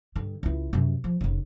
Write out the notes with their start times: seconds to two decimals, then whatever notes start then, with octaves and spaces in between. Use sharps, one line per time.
0.16 G2 D3
0.43 C#2 E4
0.73 F#2 C3
1.04 F3
1.21 F1 C#3